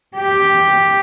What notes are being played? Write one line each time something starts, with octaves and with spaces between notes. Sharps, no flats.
G4